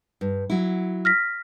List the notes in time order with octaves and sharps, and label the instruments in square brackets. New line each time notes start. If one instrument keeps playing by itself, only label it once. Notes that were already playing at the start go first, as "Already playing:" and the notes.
[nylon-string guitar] G2
F#3 E4
[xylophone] F6 A#6 B6